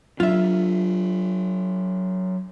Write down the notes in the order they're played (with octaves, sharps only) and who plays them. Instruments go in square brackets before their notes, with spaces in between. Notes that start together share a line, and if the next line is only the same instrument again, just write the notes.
[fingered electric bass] F#3 D4 [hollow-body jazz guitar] F4 E5